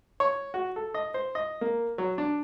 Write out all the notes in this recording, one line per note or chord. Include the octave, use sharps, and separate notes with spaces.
C#5
F#4
A4
D#5
C5
D#5
A#3
F#3
D4